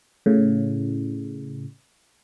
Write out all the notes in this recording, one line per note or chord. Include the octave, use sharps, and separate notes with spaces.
A2 C#3